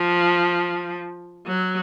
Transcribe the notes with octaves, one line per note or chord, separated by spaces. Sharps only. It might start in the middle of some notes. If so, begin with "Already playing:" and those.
Already playing: F3
F#3